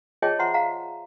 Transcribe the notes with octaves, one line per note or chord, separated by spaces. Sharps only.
F4 G#4 C#5 D#5 G5 A5
F4 C5 E5 F#5 A#5 C6
F5 A#5